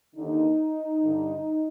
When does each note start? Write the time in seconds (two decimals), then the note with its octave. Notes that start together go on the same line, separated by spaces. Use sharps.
0.14 D#2 D3 D#4
1.01 G2 D3